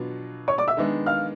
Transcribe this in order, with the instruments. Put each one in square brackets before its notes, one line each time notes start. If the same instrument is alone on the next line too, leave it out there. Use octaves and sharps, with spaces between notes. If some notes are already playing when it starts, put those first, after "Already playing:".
Already playing: [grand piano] B2 F#3 B3 D4 F4
[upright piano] C#5 C#6
D5 D6
E5 E6
[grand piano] D#3 G#3 B3 D4
[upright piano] F5 F6